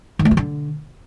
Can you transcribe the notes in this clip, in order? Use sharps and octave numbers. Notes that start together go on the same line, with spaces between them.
D#3
A3
F3
D3